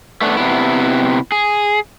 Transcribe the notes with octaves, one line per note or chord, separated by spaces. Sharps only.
A3 B3 D4
C3 B3 E4
G#4